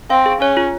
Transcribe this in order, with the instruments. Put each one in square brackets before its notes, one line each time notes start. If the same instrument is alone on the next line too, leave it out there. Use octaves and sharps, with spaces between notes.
[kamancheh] C4 [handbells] F5
[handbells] G#4
[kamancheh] C#4 [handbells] C#5
[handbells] F4